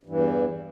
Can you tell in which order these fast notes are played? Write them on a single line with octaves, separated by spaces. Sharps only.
G2 E3 E2